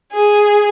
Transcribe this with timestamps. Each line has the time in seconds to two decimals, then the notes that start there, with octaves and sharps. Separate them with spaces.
0.13 G#4